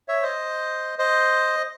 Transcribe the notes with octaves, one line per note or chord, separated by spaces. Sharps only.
C#5 E5
C5 D#5
C5 D#5